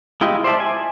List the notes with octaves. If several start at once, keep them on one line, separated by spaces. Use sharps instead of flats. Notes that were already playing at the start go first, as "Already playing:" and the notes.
G#3 E4 F4 G4 D#5
C5 D5 E5 A5
G#5